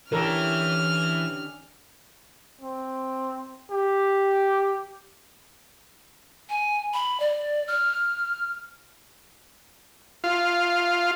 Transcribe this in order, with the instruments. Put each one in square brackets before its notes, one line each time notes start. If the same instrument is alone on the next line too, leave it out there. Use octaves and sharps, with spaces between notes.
[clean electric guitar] D3 C#4 G4 [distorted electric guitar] E3 [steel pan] A4 A#4 [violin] F6
[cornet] C4
G4
[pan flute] G#5
B5
D5
F6
[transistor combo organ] F4